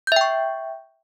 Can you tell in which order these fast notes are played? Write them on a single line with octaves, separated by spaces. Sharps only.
G6 E5 G5 C#6